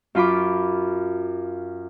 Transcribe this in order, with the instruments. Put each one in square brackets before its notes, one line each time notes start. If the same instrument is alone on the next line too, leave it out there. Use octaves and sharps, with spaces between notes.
[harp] F#2 F4 B5 D6